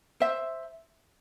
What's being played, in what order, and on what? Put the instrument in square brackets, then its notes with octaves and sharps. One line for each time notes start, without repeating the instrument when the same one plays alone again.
[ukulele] C5 E5